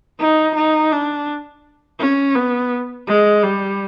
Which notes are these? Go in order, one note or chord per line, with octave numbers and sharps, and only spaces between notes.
D#4
D#4
D4
C#4
B3
G#3
G3